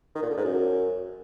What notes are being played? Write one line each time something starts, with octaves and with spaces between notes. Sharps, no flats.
D#3
A#2
D3
G#2
F#2